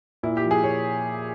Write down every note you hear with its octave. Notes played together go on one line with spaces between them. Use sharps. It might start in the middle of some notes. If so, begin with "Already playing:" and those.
A#2 E4
G4
F3
G#4
A#2 C#5